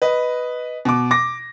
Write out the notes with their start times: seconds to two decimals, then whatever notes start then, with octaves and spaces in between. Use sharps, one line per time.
0.02 B4 D#5
0.85 B2 D6
1.11 D6 A#6